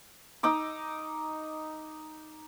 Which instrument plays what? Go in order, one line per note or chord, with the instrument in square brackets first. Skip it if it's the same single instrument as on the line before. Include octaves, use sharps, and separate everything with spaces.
[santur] D#4 D#5 D6 E6